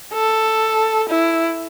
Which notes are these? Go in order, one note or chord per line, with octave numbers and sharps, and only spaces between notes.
A4
E4